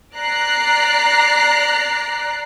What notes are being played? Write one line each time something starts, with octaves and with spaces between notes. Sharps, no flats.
D5 A#5 F#6 C7